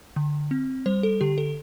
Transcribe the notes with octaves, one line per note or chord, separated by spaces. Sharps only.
D3
C4
G3 C5
A4
D3 G4
A4